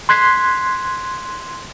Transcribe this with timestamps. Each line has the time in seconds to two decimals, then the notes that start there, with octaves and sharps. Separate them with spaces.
0.09 C6 F#6 G#6 B6 C7